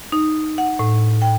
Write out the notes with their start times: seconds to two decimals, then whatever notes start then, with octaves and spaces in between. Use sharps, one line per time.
0.12 D#4
0.58 F#5
0.79 A2
1.22 G5